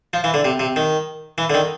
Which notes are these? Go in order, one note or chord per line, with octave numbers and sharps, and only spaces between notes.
F3
E3
D3
C3
C3
D#3
E3
D3
D#3